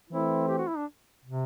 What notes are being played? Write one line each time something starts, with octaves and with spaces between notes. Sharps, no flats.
E3 A3 C4 E4
G4
F#4
E4
D4
C3